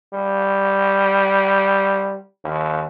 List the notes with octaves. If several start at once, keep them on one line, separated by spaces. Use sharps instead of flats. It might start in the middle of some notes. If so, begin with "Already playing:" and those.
G3
D#2